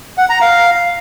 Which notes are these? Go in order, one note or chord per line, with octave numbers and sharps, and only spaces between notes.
F#5
A#5
F5